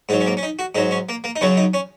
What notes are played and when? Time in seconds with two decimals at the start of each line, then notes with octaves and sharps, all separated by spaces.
0.09 G#2 F#3 D#4
0.20 C#4
0.26 A#3
0.37 C#4
0.43 D#4
0.59 F#4
0.75 G#2 F#3 D#4
0.91 C#4
1.09 A#3
1.24 A#3
1.36 D#4
1.41 F#2 C#3 F#3 C#4
1.57 D#4
1.74 C#4